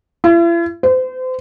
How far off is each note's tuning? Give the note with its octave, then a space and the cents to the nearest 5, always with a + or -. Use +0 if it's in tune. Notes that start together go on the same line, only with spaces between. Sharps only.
E4 +45
C5 -35